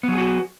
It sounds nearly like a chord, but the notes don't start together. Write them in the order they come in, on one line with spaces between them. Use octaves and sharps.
B3 F#3 G#4 F#4